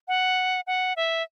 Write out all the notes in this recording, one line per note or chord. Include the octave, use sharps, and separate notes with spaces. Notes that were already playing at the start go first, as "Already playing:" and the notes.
F#5
F#5
E5